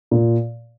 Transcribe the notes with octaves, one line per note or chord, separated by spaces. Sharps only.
A#2